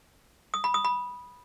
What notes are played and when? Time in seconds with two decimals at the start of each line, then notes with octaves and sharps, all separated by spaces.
0.54 D#6
0.64 B5
0.74 D#6
0.85 B5